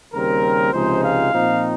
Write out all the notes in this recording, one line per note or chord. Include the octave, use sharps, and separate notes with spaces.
D#2 C#3 G3 C4 A#4
C#2 C3 F3 G#3 D#4 C5
F5
A#2 F3 C4 D#4